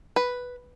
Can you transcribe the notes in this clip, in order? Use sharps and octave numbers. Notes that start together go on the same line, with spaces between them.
B4